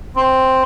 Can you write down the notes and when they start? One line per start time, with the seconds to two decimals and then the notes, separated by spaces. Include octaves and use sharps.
0.16 C4